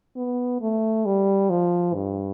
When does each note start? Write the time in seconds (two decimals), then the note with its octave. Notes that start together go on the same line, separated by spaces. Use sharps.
0.17 B3
0.61 A3
1.05 G3
1.50 F3
1.94 G2